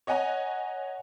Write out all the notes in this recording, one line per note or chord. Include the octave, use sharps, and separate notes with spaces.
C#5 D#5 F#5 G#5 A#5